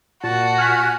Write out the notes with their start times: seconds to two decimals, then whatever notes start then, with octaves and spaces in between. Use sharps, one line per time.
0.23 A#2 F#4 A5
0.58 G#5 F6 F#6 B6